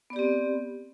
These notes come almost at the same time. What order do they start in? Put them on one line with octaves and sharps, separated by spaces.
B3 D5 G4 C4